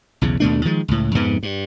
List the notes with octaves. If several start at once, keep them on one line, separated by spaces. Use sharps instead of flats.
B1 E2 C#3
D#2 B2 A3 D4
D#3 F3 G#3
C#2 A2
F2 G#2 C3 B3
G2